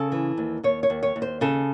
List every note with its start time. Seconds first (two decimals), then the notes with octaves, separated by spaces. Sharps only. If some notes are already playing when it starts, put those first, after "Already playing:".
Already playing: C#3 A4
0.12 E3
0.38 D#2
0.63 D#2 C#5
0.83 C#5
0.90 D#2
1.03 C#5
1.16 D#2
1.22 C5
1.41 C#3 A4